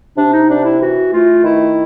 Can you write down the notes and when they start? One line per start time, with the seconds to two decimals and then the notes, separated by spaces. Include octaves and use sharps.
0.17 C3 D4
0.32 D#4
0.49 C3 D4
0.64 E4
0.80 E3 F#4
1.12 A3 F4
1.44 D#3 E4